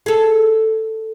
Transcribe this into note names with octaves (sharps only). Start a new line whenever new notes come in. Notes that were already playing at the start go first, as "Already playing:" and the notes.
G#4 A4